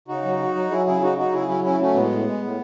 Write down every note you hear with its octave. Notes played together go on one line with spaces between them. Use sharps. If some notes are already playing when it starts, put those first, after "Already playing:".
C#3 D#4 F#4
F#3
F#3
F#3
F#3 E4 G#4
C#3 E4 G#4
F#3 D#4 F#4
F#3 D#4 F#4
C#3 E4 G#4
F#3 C#4 E4
C#3 C#4 E4
F#3 A3 C#4
A2 G#3 B3
A2
G#3
A2